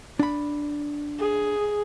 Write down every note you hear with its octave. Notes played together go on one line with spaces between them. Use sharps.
D4 B5
G#4